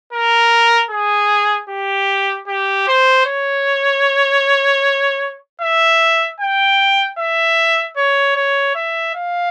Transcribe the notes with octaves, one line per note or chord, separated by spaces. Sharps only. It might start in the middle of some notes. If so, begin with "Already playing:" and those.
A#4
G#4
G4
G4
C5
C#5
E5
G5
E5
C#5
C#5
E5
F5